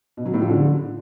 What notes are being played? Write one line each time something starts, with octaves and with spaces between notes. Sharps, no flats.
B2
F#3
A2
F3
D3